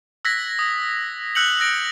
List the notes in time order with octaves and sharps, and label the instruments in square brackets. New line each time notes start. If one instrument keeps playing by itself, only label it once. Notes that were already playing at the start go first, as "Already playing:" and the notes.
[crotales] E6 F#6 G#6 A#6 B6
D#6
E6 F#6 G6 C#7 F7 F#7
E6 F#6 A#6 D7